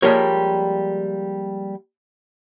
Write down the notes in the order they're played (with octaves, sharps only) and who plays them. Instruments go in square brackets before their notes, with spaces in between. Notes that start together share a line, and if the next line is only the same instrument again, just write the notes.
[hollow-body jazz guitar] F3 G3 G#3 A#3 A#4 C#5